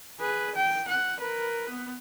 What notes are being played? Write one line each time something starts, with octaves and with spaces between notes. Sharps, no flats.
G#4 B4
G5
F#5
A#4 B4
B3